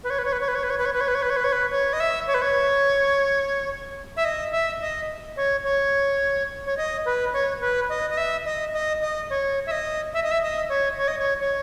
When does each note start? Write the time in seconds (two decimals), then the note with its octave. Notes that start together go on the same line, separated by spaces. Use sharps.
0.04 B4
0.10 C#5
0.19 B4
0.25 C#5
0.32 B4
0.41 C#5
0.48 B4
0.55 C#5
0.63 B4
0.70 C#5
0.78 B4
0.85 C#5
0.93 B4
1.01 C#5
1.08 B4
1.15 C#5
1.22 B4
1.30 C#5
1.37 B4
1.44 C#5
1.52 B4
1.71 C#5
1.93 D#5
2.00 E5
2.27 C#5
2.34 B4
2.42 C#5
4.17 E5
4.25 D#5
4.52 E5
4.81 D#5
5.37 C#5
5.64 C#5
6.66 C#5
6.77 D#5
7.06 B4
7.33 C#5
7.61 B4
7.89 D#5
8.10 D#5
8.17 E5
8.45 D#5
8.73 D#5
9.01 D#5
9.30 C#5
9.67 E5
9.71 D#5
10.14 E5
10.23 D#5
10.31 E5
10.42 D#5
10.69 C#5
10.98 C#5
11.08 D#5
11.19 C#5
11.40 C#5